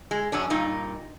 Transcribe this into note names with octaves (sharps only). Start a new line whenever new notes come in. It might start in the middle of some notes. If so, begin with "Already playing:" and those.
G#3
F#2 C#4 D4
G2 A#2 D#4